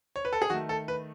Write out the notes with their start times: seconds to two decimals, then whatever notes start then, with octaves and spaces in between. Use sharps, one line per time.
0.16 C#5
0.25 B4
0.33 A4
0.42 G#4
0.50 D#3 A3 F#4
0.69 A4
0.88 B4